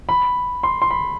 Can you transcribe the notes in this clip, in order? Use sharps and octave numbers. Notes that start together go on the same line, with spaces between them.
B5
C6
C6
B5